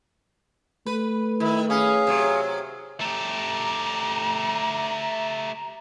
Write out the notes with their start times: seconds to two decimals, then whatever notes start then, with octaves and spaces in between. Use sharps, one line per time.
0.86 A3 B4
1.40 D#3 E4
1.70 C#4 G#4 F5
2.07 C3 F#3
3.00 A3 G4 A#5